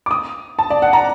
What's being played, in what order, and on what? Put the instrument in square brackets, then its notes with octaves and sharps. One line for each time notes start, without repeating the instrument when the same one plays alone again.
[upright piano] D6
D#6
A5
D5
F#5
A#5